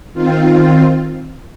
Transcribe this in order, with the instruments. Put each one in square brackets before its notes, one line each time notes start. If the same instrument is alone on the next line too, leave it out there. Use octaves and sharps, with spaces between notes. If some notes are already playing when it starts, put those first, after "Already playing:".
[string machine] D#3 C4 F4